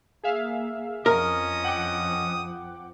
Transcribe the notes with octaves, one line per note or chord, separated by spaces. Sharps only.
A#3 G#4 E5 F5
F2 F3 C#4 A#4 D#5 D#6
F#5 G5 D6